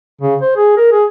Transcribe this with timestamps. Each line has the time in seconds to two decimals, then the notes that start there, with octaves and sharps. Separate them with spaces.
0.21 C#3
0.42 C5
0.56 G#4
0.77 A#4
0.91 G#4